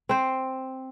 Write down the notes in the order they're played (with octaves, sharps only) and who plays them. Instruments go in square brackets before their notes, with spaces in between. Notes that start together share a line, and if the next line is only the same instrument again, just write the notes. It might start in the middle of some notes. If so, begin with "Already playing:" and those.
[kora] C4 C5